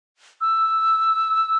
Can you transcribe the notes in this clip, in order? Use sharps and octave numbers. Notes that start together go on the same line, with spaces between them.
E6